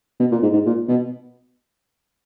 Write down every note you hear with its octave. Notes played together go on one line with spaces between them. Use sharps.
B2
A#2
G#2
G#2
A#2
B2